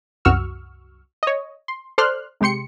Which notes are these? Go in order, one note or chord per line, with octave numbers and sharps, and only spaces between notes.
C2 F#2 F#4 C#6 E6 F6
C#5 D#5
C6
A4 C5 D5 C6 F6 F#6
C3 G#3 G4 C6 C#7